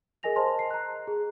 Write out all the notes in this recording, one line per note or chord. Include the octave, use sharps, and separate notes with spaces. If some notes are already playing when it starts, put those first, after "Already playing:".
G#4 A#4 D#5 G#5 A#6 F7
C5 D#5 A5 C6
C7
A#5 F#6
G#4